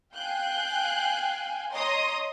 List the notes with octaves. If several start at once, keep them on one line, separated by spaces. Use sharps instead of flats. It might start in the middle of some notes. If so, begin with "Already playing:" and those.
F5 G5 G#5 F#6 G6
C#5 D#5 A#5 C6 D#6